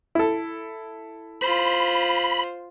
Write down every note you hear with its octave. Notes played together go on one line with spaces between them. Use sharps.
E4 A4
F4 C5 B5